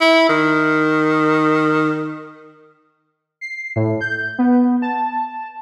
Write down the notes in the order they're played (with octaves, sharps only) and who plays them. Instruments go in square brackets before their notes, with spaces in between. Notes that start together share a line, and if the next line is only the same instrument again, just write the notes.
[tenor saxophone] E4
D#3
[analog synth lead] C7
A2
G6
B3
A5